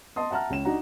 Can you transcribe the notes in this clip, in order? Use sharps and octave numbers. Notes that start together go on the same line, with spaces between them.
D#5 A5 C6 D#6
E5 F#5 A5 A#5 F6
C#2 C#4 E7
D4 D#4 F#4 F#5 A#5